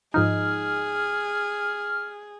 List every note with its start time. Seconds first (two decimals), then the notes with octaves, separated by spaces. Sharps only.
0.14 G#2 F3 D#4 G#4 F6